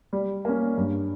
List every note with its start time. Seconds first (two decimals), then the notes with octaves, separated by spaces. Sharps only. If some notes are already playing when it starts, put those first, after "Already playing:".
0.13 G3
0.45 A#3 C#4
0.77 G2